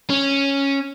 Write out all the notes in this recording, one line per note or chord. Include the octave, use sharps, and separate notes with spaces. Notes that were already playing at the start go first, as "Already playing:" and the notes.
C#4